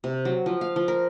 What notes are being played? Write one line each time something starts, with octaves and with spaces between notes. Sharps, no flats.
C3
F#3
F3
F5
F3
A#4